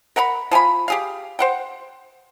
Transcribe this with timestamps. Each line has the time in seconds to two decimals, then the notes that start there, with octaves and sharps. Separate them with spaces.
0.16 A#4 F#5 A#5 B5
0.51 F3 G#5 A#5 B5
0.88 G4 G#4 F5
1.39 C5 F#5 G5